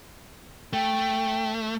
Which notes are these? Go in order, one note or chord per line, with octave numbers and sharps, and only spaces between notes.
A3 G5